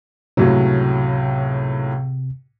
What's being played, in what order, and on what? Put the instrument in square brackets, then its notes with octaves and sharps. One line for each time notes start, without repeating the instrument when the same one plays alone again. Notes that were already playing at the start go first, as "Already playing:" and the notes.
[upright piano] C#2 A2 F#3 [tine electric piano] C3